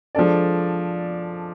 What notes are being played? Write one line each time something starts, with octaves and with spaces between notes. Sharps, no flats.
F3 G#3 D4 A4 D5